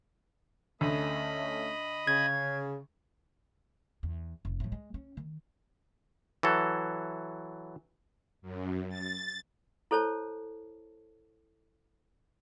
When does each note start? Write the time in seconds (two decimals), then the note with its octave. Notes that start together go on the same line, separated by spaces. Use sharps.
0.81 D2 A3 C#4 D#5 B5
2.07 C#3 G#6
4.03 E2
4.45 F1
4.60 A2 F3
4.72 G#3
4.94 C#4
5.17 D#3
6.43 E3 F#3 A4
8.42 F#2
8.89 A6
9.91 E4 A4 C5 C#5 A5